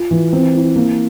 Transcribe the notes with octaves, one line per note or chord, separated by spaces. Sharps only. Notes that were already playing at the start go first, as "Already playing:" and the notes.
Already playing: F4
E3
C4
E4
A#3